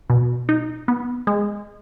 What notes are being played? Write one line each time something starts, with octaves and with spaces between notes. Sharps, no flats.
B2
D#4
B3
G#3